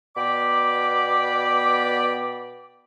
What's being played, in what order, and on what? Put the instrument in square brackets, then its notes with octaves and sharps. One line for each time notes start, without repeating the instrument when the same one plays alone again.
[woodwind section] B2 B3 D5 G5 B5 D6